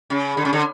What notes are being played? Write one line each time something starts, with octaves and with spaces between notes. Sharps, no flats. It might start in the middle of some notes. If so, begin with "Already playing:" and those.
C#3
D3
C#3
D3